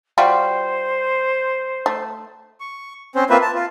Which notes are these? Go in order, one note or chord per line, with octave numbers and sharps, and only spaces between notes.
G3 F4 F#4 C5
A3
C#6
C4 C#4 C5
A#3 C4 F4 B4 E5
A5
F4